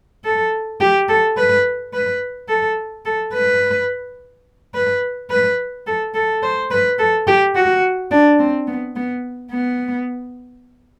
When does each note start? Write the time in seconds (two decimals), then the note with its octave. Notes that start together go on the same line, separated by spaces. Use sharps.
0.25 A4
0.81 G4
1.09 A4
1.37 B4
1.94 B4
2.49 A4
3.05 A4
3.34 B4
4.74 B4
5.30 B4
5.87 A4
6.14 A4
6.42 C5
6.71 B4
6.99 A4
7.27 G4
7.55 F#4
8.11 D4
8.40 C4
8.67 B3
8.96 B3
9.52 B3